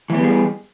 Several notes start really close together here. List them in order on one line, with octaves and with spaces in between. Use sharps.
E3 B3 G3 G#4